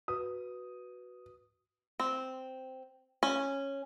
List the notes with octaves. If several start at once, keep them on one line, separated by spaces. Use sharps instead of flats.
F#4 B4 D#6
C4
C#4